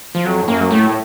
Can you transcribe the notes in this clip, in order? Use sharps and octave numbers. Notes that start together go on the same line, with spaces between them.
F3
F2 F#3
A2
F#2 A#3
F#3
A2 A3
A2